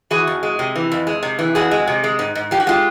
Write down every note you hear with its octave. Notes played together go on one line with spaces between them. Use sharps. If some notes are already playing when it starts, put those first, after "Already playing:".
E3 F#4 G#4
F2
G#3
C3
E3
F2
G#3
C3
E3
F2 F#4 G#4
G#3
C3
G#3
G#2
G#2
F3 G4
F#4
G#3 F4 G4